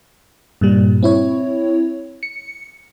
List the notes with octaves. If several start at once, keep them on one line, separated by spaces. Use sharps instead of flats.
G2 A#2 G3
C4 E4 C#5
C#7